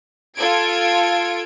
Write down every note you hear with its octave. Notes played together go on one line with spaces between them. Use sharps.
F4 A4 G#6 D7